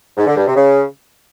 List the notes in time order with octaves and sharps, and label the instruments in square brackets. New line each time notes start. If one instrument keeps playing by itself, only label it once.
[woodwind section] G#2
D3
G2
C3
C#3